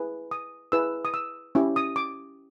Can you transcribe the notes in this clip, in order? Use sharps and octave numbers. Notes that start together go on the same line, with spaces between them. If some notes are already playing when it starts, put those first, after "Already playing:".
Already playing: E4 G#4 B4
D#6
E4 G#4 B4 E6
D#6
E6
C#4 E4 G4
D#6
D6